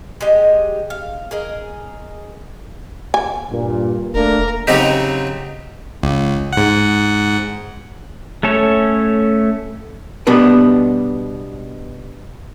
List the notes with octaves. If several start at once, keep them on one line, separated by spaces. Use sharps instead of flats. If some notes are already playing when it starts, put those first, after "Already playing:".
G#3 G4 D#5
F5
G#4 A#4 D#5
G#5
G2 A#2
E1 A3 A#3 D4 A#4
C#3 F#3 C4 D#4 G4
C#2
G#2 F#5
A3 C#4 A4 C#5
B2 G3 B3 D4 B4